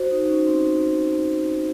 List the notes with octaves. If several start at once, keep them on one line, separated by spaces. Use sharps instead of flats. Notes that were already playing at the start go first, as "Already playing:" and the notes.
Already playing: F#4 C5
D#4
D#4
C#4
C4